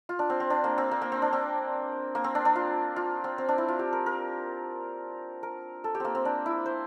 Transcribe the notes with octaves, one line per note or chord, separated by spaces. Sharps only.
F4
D4
C4
C4
D4
A#3
C4
A#3
A#3
C4
D4
C4
A#3
C4
D4
D4
F4
F4
C4
C4
D4
E4
F4
G4
A#4
A#4
A#4
A4
G4
A#3 C4
C4
D4
E4
C5